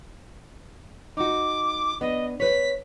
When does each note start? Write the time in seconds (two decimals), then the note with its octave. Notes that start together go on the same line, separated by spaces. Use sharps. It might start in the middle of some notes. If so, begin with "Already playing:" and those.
1.17 D#4 F#4 D6
2.01 B3 D4 D#5
2.40 B4 C#5 B6